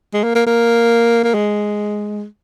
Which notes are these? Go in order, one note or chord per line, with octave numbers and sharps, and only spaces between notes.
G#3
A#3
A#3
A#3
A#3
G#3